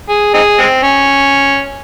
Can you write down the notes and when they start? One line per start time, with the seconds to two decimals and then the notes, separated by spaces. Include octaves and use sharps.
0.09 G#4
0.34 C4 D#4 G#4
0.59 G#3 C4
0.83 C#4